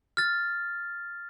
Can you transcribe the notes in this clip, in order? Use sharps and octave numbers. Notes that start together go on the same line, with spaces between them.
F6 A6